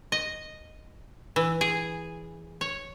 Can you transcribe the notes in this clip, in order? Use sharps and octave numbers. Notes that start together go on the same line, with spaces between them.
D#5
E3
G#4
C#5